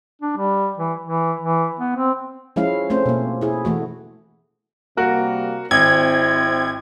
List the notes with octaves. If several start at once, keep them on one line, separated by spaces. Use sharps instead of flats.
D4
G3
E3
E3
E3
B3
C4
F3 G#3 C#4 E4 F5
A3 C4 C#4 C5
B2 A#3
E4 G#4
E3 A3 F#4
C3 G3 A#3 F#4 A#4
G#1 C4 E4 G#6